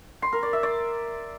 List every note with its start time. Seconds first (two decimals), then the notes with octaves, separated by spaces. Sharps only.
0.22 C6
0.33 A#4
0.43 D5
0.53 E5
0.63 D5